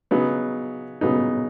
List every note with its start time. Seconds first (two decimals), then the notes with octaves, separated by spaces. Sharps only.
0.11 C#3 F#3 B3 D#4
1.01 C#3 F#3 B3 D#4